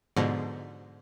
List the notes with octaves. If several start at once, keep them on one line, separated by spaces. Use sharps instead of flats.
G#2 B2 D3 F3